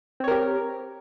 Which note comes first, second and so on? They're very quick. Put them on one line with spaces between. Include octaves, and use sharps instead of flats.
C4 C#5 A#4 G4